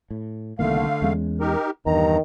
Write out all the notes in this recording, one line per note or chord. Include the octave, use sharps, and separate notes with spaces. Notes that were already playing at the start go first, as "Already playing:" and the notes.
A2
C2 D3 D#3 A3 A#3 F5
E2 G#3 C#4
D#4 G4 A#4
E2 G2 D#3 A#5